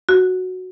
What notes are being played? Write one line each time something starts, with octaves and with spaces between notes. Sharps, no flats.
F#4